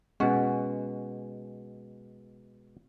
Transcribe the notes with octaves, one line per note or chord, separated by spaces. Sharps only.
B2 G#3 C#4 F#5